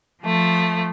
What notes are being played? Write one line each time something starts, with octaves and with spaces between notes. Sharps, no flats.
F3 A3